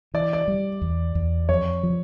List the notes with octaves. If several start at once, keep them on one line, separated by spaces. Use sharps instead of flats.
E3 D5
D5
G3
E2
E2
F2 C#5
F3